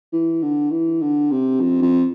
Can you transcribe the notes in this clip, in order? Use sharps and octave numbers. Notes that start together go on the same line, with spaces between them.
E3
D3
E3
D3
C3
F2
F2